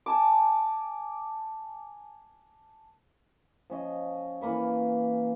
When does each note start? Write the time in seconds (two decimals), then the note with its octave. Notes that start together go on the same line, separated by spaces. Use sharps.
0.06 G#5 A5 D6
3.70 F3 C#4 D#5
4.41 E3 A#3 B4 C#6